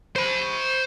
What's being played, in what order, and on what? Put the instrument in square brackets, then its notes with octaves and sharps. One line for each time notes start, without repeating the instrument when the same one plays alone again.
[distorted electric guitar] C5 B5